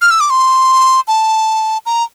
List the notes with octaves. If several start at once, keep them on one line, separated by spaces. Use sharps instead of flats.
F6
E6
D6
C6
A5
A#5